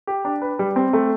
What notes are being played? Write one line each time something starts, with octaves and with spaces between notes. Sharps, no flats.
G4
D4
B4
G3
C4
A3